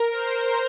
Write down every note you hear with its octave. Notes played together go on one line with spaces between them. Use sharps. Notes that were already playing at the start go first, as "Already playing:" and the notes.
Already playing: A#4
C5